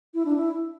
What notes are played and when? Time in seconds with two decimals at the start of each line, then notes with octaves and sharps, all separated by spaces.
0.14 E4
0.25 D4
0.36 E4